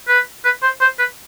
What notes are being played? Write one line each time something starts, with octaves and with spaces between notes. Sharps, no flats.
B4
B4
C5
C5
B4